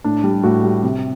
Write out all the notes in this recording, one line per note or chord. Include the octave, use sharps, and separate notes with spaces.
A2 D4
G3
A2 F#4
G3
C3